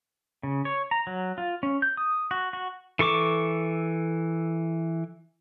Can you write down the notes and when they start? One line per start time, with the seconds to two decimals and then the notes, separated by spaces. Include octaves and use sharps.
0.43 C#3
0.65 C#5
0.91 A#5
1.07 F#3
1.38 F4
1.63 C#4
1.82 G6
1.97 D#6
2.31 F#4
2.53 F#4
2.99 E3 A4 C#6 D6